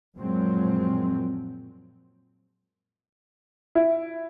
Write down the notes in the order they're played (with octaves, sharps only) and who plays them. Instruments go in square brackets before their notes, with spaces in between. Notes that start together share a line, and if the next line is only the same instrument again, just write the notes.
[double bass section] F#2 A#2 F3 F#3 G#3 C4
[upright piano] E4